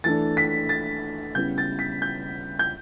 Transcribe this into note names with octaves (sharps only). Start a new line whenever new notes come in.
E3 A3 D4 A6
B6
A6
C#3 G3 B3 E4 G6
A6
B6
G6
G6